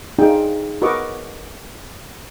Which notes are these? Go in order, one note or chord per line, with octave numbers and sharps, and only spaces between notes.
D4 D#4 F4 G#4 G5
F#4 A#4 B4 D#5 C#6 D6